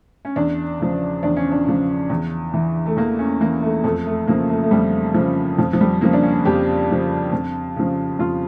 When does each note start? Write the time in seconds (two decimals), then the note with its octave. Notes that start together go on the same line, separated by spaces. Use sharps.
0.25 C#4
0.36 E2 D4
0.80 C#3 F3
1.23 E2 D4
1.37 C#4
1.51 D4
1.67 C#3 F3
2.10 E2
2.54 E3
2.86 A3
2.97 E2 A#3
3.19 C#4
3.41 E3 A#3
3.62 A3
3.84 F2 A3
4.06 A3
4.27 C#3 F3 A#3
4.50 A3
4.62 A3
4.71 F2 G3
5.14 C#3 F3
5.58 F2 F3
5.73 F3
5.81 G3
6.01 C#3 F3 A#3
6.13 D4
6.23 C#4
6.45 F2 G4
6.89 C#3 F3
7.32 F2
7.76 C#3 F3
8.19 F2 F4